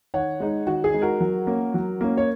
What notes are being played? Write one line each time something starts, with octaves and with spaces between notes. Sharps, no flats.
D#3 C#5 F#5
G#3 D#4
D#3 F#4
G#4
G#3 D#4
F#4 A#4
F#3
A#3 C#4
F#3
A#3 C#4
C#5